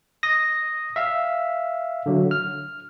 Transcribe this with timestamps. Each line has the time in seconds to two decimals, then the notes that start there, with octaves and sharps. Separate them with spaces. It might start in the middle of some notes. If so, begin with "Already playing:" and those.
0.23 D#6 A#6
0.96 E5 F5
2.06 D3 F#3
2.31 F6